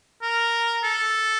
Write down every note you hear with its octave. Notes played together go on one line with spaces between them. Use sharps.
A#4
A4